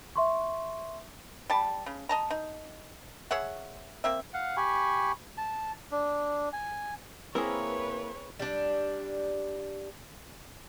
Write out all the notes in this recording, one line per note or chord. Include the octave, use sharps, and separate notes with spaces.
E5 C6 C#6
G3 A5
C#3
D#5 A5 A#5
D#4
G#4 C#5 E5 F#5
A#3 C4 E5
F5 F#5
G4 G#5 B5 C#6
A5
D4
G#5
A#3 C4 E4 G#4 A#4 B4 C#5
G3 D4